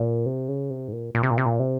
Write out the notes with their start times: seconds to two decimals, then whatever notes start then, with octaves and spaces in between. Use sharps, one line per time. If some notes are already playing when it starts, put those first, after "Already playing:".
Already playing: A#2
0.26 C3
0.48 C#3
0.70 C3
0.88 G#2
0.92 A#2
1.15 A#2
1.23 C3
1.31 A#2
1.38 C3
1.46 A#2
1.60 C3